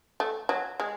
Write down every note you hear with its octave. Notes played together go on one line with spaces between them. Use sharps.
A3
F#3
G#3